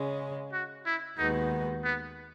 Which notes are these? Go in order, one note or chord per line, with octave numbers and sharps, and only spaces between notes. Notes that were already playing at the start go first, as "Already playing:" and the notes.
Already playing: C#3 G#3 C#4
F#4
E4
D#2 D#3 G#3 B3 D#4 F#4
B3